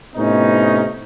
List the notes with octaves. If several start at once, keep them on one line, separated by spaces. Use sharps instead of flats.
A2 C3 B3 C#4 D#4